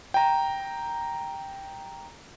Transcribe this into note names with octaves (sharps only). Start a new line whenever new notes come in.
G5 A#5